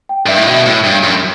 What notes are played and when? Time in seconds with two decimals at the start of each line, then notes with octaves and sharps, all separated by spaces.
0.09 G5
0.26 G2 E5
0.37 A2
0.47 B2 E5
0.66 A2
0.84 G2
1.03 F#2